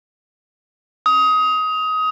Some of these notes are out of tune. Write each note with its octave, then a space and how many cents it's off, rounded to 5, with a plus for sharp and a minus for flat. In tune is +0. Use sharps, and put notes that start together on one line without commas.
D#6 +20